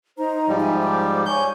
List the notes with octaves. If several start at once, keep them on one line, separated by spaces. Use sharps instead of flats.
D#4 C5 A#5
G#2 F3 G3
E5 G#5
D6
C#5 G#5 C#6 G6